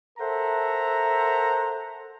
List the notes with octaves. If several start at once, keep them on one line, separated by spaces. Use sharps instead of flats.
A4 A#4 C5 E5 F#5 A#5